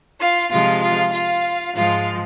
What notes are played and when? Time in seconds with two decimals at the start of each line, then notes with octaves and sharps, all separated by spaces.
0.20 F4 F5
0.51 C3 F3 G#3 F4 F5
0.82 F4 F5
1.13 F4 F5
1.75 G#2 F3 G#3 F4 F5